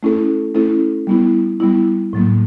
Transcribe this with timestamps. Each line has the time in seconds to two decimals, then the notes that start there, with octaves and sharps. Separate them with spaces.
0.03 A3 C#4 E4 A4
0.54 A3 C#4 E4 A4
1.07 G3 B3 E4
1.60 G3 B3 E4
2.13 A2 F#3 A#3